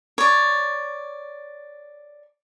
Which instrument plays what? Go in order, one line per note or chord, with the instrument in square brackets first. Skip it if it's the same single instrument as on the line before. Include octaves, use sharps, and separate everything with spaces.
[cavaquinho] C#5 D5